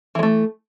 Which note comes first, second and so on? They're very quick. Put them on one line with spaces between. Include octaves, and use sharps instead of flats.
E3 G#3 A3